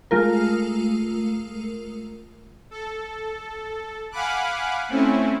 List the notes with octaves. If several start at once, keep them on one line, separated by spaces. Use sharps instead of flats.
G#3 A3 F4 A#4
A4
F5 F#5 G#5 B5 D6 F#6
A3 C4 C#4 E4